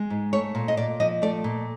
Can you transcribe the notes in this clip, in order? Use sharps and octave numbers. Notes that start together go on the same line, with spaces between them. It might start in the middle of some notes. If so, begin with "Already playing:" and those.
Already playing: G#3
G#2
A3 C#5
A#2
D#5
A#2 D5
F3 D#5
A3 D5
A#2